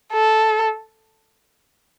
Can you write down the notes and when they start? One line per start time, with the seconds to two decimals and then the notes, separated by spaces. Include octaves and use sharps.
0.13 A4